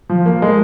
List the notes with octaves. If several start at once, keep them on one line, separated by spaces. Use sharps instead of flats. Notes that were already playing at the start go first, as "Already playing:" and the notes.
F3
A#3
G#3